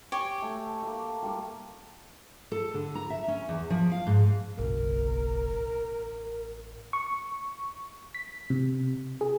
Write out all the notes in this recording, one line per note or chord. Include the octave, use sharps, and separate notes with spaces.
G4 C#5 G#5
A3
A3 A#3
G3 A#4
A4
D3
A#5
E5
C#4
E2
F3
F5
G#2
F#1 B1 A#4
A1
C#6
B6
C3
G#4